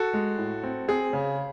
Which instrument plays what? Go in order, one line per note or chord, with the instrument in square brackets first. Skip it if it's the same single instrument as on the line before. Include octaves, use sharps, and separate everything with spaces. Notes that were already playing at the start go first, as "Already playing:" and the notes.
Already playing: [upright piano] F#4 A4
G#3
A2
C4
C4 G#4
C#3